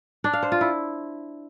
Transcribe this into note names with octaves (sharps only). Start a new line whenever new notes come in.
D4
F5
C5
F4
E4